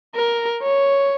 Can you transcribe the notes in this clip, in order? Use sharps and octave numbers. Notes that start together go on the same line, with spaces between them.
A#4
C#5